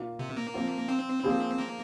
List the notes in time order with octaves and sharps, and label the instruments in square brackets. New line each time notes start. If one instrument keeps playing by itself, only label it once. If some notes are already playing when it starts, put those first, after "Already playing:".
Already playing: [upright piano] A#2 A#3 F4
[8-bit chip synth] C3
A#3
[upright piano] F3 C4 F4
[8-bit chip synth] C4
[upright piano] F3 A#3 G#4 C5
[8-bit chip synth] A#3